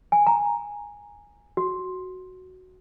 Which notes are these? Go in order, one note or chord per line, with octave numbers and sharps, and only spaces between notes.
G#5
A#5
F#4